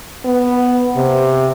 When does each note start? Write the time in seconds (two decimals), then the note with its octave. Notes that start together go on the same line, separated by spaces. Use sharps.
0.25 B3
0.96 C3